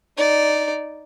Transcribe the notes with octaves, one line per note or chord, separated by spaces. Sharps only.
D#4 D5